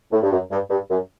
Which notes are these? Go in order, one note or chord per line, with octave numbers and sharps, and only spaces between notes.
A2
G2
F#2
G2
G2
F#2